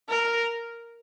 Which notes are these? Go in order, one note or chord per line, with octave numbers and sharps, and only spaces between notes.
A#4